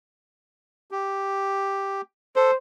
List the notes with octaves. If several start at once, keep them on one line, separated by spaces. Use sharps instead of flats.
G4
A4 C5